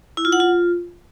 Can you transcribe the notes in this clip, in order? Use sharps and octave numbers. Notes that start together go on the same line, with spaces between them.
E4
F4
F#5
F4